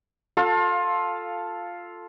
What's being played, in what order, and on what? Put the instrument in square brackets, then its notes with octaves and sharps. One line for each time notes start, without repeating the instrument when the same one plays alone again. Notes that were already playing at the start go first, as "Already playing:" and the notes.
[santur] F4 A4 F5